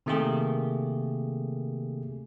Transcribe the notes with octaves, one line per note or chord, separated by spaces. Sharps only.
C3 D#3 A3 A#3 G4 G#4